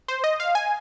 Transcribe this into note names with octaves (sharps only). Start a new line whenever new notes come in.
C5
D#5
F5
G#5